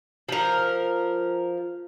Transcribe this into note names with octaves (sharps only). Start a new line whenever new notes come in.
F3 A#4